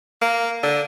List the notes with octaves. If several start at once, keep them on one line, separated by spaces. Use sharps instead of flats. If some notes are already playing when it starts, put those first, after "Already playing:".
A#3
D3